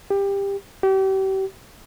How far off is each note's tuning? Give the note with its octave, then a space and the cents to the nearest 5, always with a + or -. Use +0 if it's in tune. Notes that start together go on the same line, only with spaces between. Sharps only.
G4 +20
G4 -35